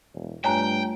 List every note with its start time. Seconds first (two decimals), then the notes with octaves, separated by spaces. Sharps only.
0.14 E1
0.44 G2 A3 F4 C#5 G5 G#5 A#5 F#6